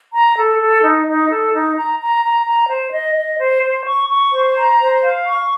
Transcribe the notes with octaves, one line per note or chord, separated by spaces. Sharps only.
A#5
A4
A4
D#4
D#4
A4
D#4
A#5
A#5
A#5
A#5
C5
D#5
D#5
C5
C5
C#6
C#6
C5
A#5
C5
F5
C#6